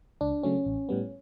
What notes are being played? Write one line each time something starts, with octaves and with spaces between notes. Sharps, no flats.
C#2 D4
C#3 F#3 A3 C#4
A1
A2 G3 B3